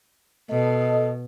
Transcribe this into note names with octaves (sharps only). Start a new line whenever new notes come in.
B2 A4 D#5